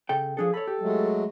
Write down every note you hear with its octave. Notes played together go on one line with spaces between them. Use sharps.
C#3 A4 G5
F3 D4 G#4 A4
A4 C#5 B5
G4
F#3 G#3 A3